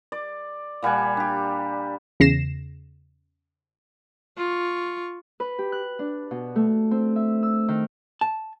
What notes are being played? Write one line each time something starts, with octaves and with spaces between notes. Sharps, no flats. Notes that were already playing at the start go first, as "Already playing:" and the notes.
D5
A#2 G3 F#5 G#5
D4 G4
E2 C#3 A#6 C7 E7
F4 C#6
B4
G4
F#6
D4
B2
A3
C4
E5
E6
D#3
A5